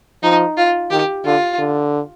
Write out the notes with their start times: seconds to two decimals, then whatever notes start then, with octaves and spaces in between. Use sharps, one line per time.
0.23 F3 D#4
0.57 F4
0.91 D#3 G4
1.25 D3 F4
1.59 D3